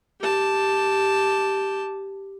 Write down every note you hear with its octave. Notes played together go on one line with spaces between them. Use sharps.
G4 A5